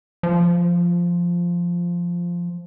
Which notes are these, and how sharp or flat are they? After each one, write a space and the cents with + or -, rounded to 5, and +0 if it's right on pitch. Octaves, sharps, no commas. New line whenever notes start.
F3 -5